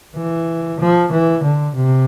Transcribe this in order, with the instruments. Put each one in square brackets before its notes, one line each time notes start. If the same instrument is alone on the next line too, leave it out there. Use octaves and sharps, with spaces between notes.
[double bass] E3
F3
E3
D3
C3